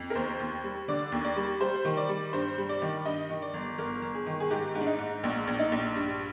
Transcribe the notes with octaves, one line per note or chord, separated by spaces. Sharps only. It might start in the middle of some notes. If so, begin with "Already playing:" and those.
Already playing: F2
A#4
D#2 C5
D#2
G3
D3 D5
D#2
D5
G3
G3 C5
D#3
D5
G3
G2 C5
G3
D5
D#3
G2 D#5
D#3
D5
G1
G1 A#4
G1
G#4
D#3
G#4
G#2 G4
G#2
D4
D#4
G#2
A#1
A#1
D#4
A#1
G2